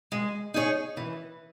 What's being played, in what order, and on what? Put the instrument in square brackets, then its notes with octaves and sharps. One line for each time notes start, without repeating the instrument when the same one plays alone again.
[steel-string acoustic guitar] G#3
D#4 G#4 C#5
E3